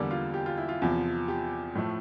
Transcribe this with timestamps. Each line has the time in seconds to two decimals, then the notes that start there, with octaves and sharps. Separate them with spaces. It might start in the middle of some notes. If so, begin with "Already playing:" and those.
Already playing: E2 D3 G3 A#3 D5
0.11 F4
0.34 G4
0.46 F4
0.57 E4
0.69 F4
0.82 E2 C3 F3
1.28 G4
1.75 A2 F3 A3